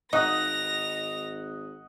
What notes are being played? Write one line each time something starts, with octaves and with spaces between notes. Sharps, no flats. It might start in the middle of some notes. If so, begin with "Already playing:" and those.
G#1 D#4 D#5 F#5 D#6 A#6 F7